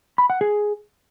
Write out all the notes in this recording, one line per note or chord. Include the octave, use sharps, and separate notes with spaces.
B5
F#5
G#4